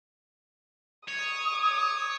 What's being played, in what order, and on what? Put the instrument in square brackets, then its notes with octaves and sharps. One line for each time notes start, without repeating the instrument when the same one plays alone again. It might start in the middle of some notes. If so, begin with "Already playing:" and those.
[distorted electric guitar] C#5 [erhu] D#6